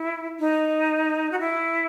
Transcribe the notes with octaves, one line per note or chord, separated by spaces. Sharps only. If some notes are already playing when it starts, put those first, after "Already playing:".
Already playing: E4
D#4
F#4
E4